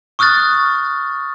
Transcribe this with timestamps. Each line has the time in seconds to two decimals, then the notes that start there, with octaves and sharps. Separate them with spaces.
0.19 C#6 D#6 F6 F#6 A6